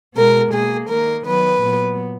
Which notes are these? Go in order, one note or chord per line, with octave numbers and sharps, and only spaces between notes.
B2 G#3 B3 A#4
B2 A#3 G#4
D#3 A#3 A#4
D#3 F#3 B3 B4
A#2 F#3 B3